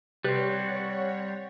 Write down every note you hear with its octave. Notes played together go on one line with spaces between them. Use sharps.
C3 G3 C4 B4 C#5 F#5